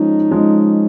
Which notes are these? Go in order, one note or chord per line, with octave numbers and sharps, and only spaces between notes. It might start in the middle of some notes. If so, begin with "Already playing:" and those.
Already playing: F3 G#3 C#4 D#4
F3 G#3 C#4